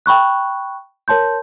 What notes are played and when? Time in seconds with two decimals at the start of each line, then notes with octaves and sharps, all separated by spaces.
0.06 G5 B5 C#6 F#6
1.08 A#4 C#5 A5 C6 G6